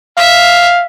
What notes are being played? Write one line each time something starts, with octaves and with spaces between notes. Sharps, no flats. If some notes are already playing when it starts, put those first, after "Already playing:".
E5 F5